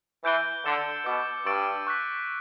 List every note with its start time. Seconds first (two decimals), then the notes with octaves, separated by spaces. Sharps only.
0.24 E3 G6 D7 G7
0.65 D3 E6 A6 C#7 E7
1.06 B2 D6 G6 C#7
1.46 G2 C#6 E6 A6 D7
1.87 C#6 F#6 B6